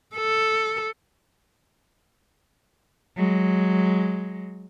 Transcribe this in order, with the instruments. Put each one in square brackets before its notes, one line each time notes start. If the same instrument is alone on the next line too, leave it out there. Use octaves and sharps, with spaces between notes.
[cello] A4
F#3 G#3